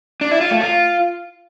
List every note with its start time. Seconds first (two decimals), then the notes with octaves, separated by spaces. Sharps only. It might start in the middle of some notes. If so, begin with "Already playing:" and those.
0.21 D4
0.31 E4
0.41 F4
0.51 A3
0.61 F4